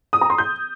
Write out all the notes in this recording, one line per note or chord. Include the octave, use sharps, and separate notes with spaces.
D#6
A#5
C6
G6